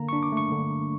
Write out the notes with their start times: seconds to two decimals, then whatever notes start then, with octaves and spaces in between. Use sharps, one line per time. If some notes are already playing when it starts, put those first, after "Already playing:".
Already playing: D3 A#3 A#5
0.09 D4 C#6
0.23 D6
0.32 A3 C#6
0.52 D3